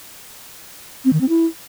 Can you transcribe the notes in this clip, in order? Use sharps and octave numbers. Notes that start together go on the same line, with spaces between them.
C4
D#3
C4
E4